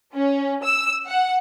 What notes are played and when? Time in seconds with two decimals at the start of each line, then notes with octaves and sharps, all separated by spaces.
0.14 C#4
0.63 E6
1.07 F#5